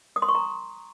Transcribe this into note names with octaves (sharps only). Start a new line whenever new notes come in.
D#6
C6
C#6
A#5